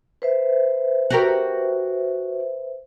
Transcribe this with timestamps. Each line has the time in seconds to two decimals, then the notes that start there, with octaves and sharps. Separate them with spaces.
0.22 B4 C5 E5
1.10 F#4 G4 A#4